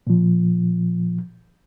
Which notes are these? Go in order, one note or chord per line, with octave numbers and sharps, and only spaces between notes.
A#2 F3